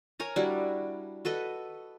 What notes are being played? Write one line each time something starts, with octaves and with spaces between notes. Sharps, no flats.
A#4 C#5 G#5 A#5
G3 D4 E4 F#4
F#4 A4 B4 D#5